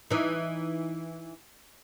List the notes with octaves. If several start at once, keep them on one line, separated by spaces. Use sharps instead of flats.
E3 D#4